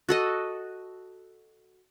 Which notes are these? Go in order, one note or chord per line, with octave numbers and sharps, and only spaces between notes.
F#4 A4 D#5